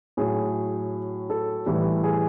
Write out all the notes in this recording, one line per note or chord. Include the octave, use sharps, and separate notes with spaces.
A2 F#3 G#4
A4
A2 E3 G3
G#4